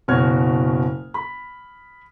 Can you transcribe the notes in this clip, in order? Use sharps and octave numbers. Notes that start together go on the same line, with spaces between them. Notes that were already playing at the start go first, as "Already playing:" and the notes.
F#1 B2 F#4 C#5 F6 G#6
B5